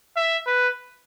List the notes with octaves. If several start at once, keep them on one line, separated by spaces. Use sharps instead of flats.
E5
B4